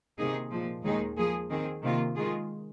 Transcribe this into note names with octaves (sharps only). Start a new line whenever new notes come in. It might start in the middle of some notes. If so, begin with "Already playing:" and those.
C3 D#3 A#3 D#4 G#4
A#2 F3 G#3
D#2 D#3 G#3 D#4 G#4
F3 A#3 G#4
D#3 C4 G#4
C3 D#3 A#3 F4
D#3 G#3 F4 G#4